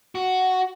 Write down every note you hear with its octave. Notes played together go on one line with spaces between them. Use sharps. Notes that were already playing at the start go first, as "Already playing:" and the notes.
F#4